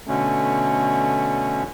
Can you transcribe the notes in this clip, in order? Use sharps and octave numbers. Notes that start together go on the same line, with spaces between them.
B2 D3 A3 C#4